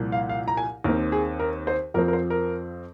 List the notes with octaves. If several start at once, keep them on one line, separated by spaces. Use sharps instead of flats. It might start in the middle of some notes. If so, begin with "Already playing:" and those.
Already playing: C2 A#2 F3
F5
F5
A#5
G#5
D#2 D#3 C4 A#4
G#4
A#4
C5
F2 F3 C4 A#4
A#4
C5
A#4